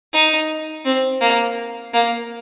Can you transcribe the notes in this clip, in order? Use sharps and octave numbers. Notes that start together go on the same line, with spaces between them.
D#4
C4
A#3
A#3